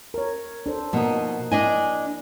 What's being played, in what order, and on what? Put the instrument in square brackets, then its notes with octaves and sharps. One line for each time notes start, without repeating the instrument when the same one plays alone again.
[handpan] A#4 C#5
D4 A4 C5
[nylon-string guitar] B2 D#4 [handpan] F3 A#3 D#5
[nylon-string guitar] D4 D#5 G#5 [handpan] E4